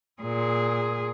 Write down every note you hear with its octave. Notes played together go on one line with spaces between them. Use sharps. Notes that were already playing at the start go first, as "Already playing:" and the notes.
A#2 G#4